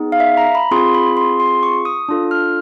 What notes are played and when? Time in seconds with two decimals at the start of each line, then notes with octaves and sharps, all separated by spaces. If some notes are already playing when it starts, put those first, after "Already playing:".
Already playing: B3 D#4 G#4
0.12 F5
0.20 E5
0.37 A#5
0.55 B5
0.71 C4 F4 G#4 C6
0.94 B5
1.17 C6
1.40 C6
1.63 C#6
1.85 D#6
2.09 D4 F4 A4
2.31 F6